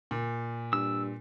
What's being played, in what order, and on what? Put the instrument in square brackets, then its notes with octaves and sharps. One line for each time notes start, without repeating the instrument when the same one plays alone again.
[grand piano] A#2
[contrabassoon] G2 [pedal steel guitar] E6